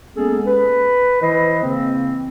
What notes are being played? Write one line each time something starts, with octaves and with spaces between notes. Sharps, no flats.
G#3 A#3 B3 C#4 G#4 A4
B4
E3 E4 C5 D#5
C#3 E3 A#3 C4